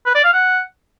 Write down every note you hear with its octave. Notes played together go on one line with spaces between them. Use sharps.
B4
D5
F5
F#5